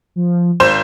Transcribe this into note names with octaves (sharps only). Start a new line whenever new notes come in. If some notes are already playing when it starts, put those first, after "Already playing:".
F3
G#1 C5 G6 E7